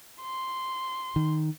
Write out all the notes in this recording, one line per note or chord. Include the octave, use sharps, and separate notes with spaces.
C6
D#3